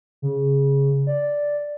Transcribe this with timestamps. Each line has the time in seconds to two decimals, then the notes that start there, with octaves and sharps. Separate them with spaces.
0.22 C#3
1.07 D5